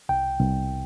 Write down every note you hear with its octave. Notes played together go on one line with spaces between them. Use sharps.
C2 G5
C2